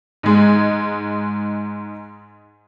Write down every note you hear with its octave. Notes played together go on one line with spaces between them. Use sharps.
G#2 G#3